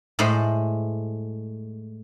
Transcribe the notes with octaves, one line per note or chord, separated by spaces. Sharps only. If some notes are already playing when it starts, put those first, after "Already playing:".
A2 G#3 C5 B5